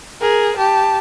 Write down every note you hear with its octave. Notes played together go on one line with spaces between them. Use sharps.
G#4 A#4
G4 A5